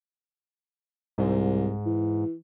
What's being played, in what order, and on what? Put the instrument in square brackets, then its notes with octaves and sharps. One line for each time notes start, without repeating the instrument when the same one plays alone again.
[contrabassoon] C2 [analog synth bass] G#2
[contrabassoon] E3